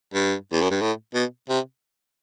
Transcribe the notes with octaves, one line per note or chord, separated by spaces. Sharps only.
G2
E2
F#2
G2
A2
B2
C3